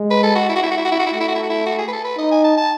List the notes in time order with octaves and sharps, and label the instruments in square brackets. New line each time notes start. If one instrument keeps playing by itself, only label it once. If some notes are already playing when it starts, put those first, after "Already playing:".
Already playing: [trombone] G#3
[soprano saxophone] B4
A4
F#4
E4
F#4
E4
F#4
E4
F#4
E4
F#4
E4
[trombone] A3 [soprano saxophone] F#4
[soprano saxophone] E4
F#4
E4
F#4
E4
F#4
G#4
B4
A4
B4
[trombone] D#4 [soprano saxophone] D#5
[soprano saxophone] G#5
A5
A5